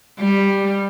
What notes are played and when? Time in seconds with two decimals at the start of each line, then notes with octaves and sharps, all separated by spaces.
0.19 G3